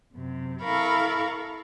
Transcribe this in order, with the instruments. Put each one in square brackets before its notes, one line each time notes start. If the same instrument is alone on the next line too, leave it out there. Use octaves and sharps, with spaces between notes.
[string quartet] F#2 C3
E4 A4 A#4 F5 B5 C#6